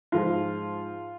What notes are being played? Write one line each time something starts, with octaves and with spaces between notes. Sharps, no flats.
G#2 F3 G#3 F4